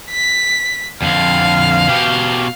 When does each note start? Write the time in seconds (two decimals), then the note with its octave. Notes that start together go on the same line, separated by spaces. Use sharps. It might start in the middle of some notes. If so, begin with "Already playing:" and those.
0.11 B6
1.02 F2 D3 F5
1.89 B2 G4